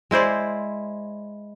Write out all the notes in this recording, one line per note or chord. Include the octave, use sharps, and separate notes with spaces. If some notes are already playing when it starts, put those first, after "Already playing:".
G#3 E4 C5 D5